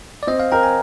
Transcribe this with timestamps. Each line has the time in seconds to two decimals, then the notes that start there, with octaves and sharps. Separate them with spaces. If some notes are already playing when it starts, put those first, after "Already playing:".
0.23 D5
0.27 C4 D#5
0.39 F5
0.52 A#4 G5
0.63 G#5